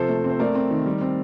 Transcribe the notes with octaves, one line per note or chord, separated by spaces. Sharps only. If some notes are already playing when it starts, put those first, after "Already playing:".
Already playing: C3 F3 A4 C5
A3
C4 C5
A3 A#4 D5
C4
D#3
G3
C4